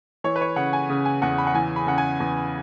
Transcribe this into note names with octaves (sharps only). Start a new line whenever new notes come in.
E3 C#5
B4
C#5
C#3 F#5
G#5
C#3
G#5
E2 F#5
B5
F#5
E3 G#5
B5
C#3 F#5
G#5
E2